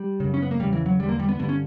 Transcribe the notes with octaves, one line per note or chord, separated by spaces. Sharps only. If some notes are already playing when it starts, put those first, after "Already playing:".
Already playing: G3
F#2 C#3
C#4
B3
A#3
E2 C#3 G3
E3
F#3
E2 D3 G3
A#3
G3
B3
G2 D3 B3
C#4